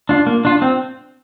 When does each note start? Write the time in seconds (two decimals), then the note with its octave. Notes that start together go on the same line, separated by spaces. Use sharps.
0.09 D4 F4
0.27 A#3
0.45 D4 F4
0.62 C4